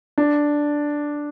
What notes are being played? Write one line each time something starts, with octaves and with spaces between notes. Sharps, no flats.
D4